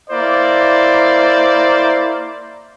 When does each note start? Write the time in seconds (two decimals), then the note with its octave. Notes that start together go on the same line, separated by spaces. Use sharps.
0.10 A#3 E4 C5 D5